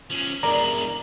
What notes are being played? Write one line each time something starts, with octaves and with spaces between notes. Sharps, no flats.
F3 C#4 F#7
E2 G2 G#3 A#4 D5 A#5